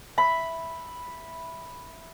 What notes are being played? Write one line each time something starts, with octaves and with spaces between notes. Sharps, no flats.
E5 B5